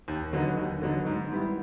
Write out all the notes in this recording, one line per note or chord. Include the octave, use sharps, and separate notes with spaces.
D#2
D3 F#3 B3 D#4
D#2
D3 F#3 B3 D#4
G#2
D#3 G3 B3 E4